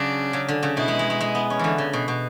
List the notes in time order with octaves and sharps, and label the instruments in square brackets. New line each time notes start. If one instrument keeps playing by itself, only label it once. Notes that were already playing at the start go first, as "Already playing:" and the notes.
Already playing: [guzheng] C#3 F#3 [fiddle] D4
[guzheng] C#3
D3
C#3
[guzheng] B2 [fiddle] E4
[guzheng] G#3
G#3
G#3
G#3
B3
C#4
D3 E3
C#3
B2
B2